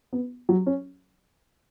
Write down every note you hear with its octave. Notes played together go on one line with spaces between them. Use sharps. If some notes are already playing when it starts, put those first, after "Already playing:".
B3
F#3
C#4